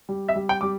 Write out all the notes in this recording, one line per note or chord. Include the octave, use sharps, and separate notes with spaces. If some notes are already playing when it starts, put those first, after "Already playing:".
G3
E5
G3
G5
G3 D6